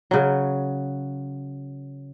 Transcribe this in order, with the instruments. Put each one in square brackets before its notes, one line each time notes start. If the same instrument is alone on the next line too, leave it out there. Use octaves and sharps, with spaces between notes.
[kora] C#3 F#3